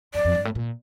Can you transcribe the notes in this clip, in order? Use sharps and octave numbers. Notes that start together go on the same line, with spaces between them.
F2 D5
F2
G2
A2
A#2